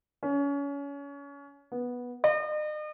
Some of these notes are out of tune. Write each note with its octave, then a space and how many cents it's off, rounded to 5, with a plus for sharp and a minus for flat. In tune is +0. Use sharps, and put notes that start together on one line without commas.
C#4 +30
B3 -10
D#5 -40